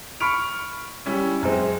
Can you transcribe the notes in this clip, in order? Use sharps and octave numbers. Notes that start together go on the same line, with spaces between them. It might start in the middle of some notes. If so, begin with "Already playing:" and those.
B5 C#6 F6 B6 D7 F7
G3 C#4 E4
F#2 G#3 C4